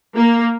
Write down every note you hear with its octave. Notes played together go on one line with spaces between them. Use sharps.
A#3